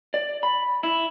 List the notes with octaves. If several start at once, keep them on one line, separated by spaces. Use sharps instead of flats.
D5
B5
E4